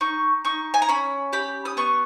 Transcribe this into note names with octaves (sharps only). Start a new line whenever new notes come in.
D#4 C#6
D#4 C#6
G#5
A#5
C#4 B5
G4 B5
D#6
B3 C#6